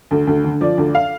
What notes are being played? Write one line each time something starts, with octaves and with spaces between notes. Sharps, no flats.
D2
D2
D3
F3 D5
D2
F5